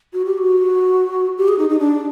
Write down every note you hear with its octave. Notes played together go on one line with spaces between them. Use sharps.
F#4
G4
F#4
G4
G#4
D#4
D#4
D4